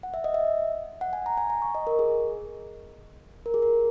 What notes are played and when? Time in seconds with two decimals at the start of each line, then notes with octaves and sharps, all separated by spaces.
0.03 F#5
0.14 E5
0.24 D#5
0.34 E5
1.01 F#5
1.13 G#5
1.26 A#5
1.37 G#5
1.50 A#5
1.62 C#6
1.75 D#5
1.87 A#4
1.99 G#4
3.46 A#4
3.54 G#4
3.62 A#4